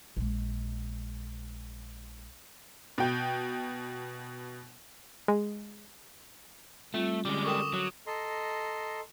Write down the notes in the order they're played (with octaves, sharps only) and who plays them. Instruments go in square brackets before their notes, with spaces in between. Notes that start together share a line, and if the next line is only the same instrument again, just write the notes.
[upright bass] A#1 G#3
[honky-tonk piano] B2 G5
[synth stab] G#3
[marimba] G3 C4 F4 [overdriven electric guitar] A3
[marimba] D3 C#4 [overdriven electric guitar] G3 G#3 [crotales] D6 G7
[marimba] A4 A#4 G5 [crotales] C#6 D#6 E7
[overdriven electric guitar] F#3
[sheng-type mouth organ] A4 D#5 A#5 C6